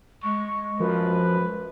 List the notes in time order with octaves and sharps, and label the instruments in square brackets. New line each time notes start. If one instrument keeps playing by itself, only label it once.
[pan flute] G#3 [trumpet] C#6
[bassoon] F#2 [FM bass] F3 [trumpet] B4